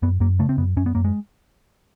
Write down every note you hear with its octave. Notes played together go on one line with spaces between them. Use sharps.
F#2 B3
F#2 A#3
C#3 A3
C4
F#2 B3
F#2 C#4
B3
F#2 A#3
G#3